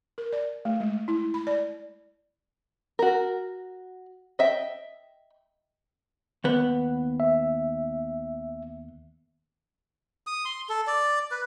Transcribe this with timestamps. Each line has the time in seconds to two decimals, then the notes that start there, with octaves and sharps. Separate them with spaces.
0.18 A#4
0.33 D5
0.65 A3
0.80 G#3
1.08 E4
1.34 B5
1.47 D5
2.99 F#4 A#4
4.39 D#5 E5 G5
6.44 D#2 B3
7.20 E5
10.27 D#6
10.45 C6
10.69 A4
10.87 D5
11.31 B4